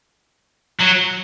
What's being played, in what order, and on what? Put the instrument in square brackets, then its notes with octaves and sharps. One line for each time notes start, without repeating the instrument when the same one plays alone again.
[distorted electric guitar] F#3